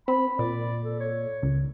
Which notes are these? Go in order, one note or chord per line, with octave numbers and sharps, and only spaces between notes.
C4 B5
A#2 D5
A4
C#5
C#2